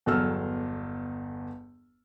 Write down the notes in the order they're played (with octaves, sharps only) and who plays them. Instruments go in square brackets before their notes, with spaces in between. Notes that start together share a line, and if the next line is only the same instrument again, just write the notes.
[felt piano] G1 E2 F#3 A4 E6 F6